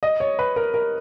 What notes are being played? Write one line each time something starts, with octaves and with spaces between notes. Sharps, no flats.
D#5
C#5
B4
A#4
A#4